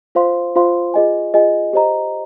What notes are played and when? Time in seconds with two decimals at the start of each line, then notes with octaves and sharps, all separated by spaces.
0.15 F4 C5 F5 C6
0.56 F4 C5 F5 C6
0.94 F4 G#4 D#5 G#5
1.34 F4 G#4 D#5 G#5
1.73 G4 C5 D#5 A#5